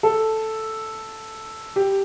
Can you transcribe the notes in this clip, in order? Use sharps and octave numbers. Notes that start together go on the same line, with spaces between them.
A4
G4